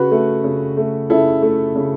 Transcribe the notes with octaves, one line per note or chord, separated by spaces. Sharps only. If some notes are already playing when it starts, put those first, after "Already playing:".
Already playing: C#3 F#4 B4
A3
C#3
A3
C#3 E4 A4
A3
C#3